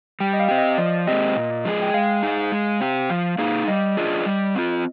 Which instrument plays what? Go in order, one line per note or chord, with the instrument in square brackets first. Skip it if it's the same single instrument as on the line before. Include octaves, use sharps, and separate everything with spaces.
[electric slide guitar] G3 [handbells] G5
[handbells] D#5
F5
[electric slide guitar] C4 G4
[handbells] D#5
[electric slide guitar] F3 [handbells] D5
[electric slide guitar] G#3 C4 G4 [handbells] D#5
[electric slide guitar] A#2
F3 G#3 D4 G#4
[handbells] G5
[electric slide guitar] G#3 [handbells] F5
[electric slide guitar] D#4 G#4
G#3
C4 G4
[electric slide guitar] F3 [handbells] F5
[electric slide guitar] A#3 D#4 G#4 [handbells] F5
[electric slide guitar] G3 [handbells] D#5
[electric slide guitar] D4 F4 G#4
G3
C4 F4